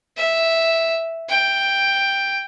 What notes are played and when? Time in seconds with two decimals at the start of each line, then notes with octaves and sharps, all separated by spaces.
0.17 E5
1.29 G5